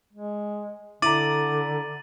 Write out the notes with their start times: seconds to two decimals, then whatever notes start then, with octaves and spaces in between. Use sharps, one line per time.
0.13 G#3
1.02 D3 E4 A#5 D6 A6 D#7 F#7